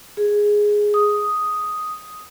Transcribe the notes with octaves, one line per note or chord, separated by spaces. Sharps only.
G#4
D#6